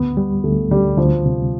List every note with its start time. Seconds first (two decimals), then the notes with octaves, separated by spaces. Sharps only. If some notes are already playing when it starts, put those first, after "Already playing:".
Already playing: D2 B3
0.17 G3
0.44 D2 A3
0.71 D2 G3
0.97 D2 F3
1.25 C3